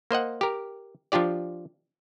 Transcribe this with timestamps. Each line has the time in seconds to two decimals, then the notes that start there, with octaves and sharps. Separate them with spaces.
0.11 A#3 C5 D#5 F#5
0.41 G4 A#4
1.12 F3 D4 F4 G4 D5